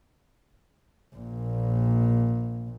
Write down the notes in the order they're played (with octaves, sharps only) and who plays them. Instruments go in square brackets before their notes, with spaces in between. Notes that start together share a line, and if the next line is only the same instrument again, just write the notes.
[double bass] A#1 A#2